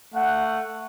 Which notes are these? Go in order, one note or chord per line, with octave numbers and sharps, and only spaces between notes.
A3 F#5